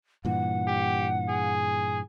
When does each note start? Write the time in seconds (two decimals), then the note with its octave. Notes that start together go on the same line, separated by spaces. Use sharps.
0.25 G2 A#2 E3 F#5
0.67 G4
1.29 G#4